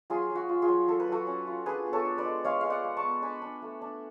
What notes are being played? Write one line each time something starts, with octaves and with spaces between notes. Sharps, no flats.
F#3 F4 G#4
F#3
F#4
F4
F4 G#4
F#3
F#3 A4
B4
F#3 F#4 A4
C#4
F4
D4 G#4 B4
B3
A4 C#5
D4
B4 D5
G#3
G#3 C#5 F5
G#3 F5
D5 F#5
G#3
A5 C#6
B3
D4 G#5 B5
D4
A3
D4